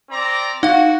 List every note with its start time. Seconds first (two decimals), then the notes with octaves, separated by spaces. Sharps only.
0.10 C4 D5 A#5
0.63 D#4 F#4 F5 F#5